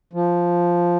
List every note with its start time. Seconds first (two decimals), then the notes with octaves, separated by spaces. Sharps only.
0.13 F3